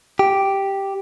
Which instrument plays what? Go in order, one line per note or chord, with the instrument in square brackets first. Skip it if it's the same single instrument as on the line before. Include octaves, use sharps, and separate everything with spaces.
[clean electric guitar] G4